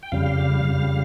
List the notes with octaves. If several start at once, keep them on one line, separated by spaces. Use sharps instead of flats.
G5
F2 C#3 G3 F5
F2 C#3 G3